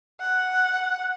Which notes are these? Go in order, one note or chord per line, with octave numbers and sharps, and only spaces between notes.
F#5